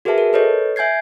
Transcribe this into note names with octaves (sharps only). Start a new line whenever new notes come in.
F#4 G#4 A#4 B4 E5 A5
A#4
A4 B4 C#5 D#5
E5 G#5 G6 G#6 C7